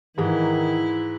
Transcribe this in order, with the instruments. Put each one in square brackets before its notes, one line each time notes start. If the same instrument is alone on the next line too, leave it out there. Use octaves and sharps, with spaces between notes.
[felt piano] G#2 E3 [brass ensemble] D#3 [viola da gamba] E4